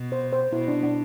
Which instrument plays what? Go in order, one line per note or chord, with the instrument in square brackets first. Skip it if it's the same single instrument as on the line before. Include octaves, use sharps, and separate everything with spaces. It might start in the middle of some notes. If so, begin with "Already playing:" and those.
Already playing: [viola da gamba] B2
[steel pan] C5
C5
[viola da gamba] B2 [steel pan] E4
[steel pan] D4
D4